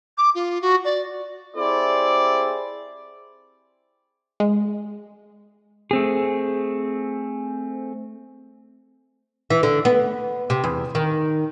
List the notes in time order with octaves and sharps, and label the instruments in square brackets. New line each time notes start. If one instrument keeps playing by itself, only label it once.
[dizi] D6
F4
F#4
D5
[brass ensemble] C4 E4 G4 G#4 C5 D5
[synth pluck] G#3
[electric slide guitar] A3 C4 G#4
[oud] E3
D3
B3
C3
E2
D#3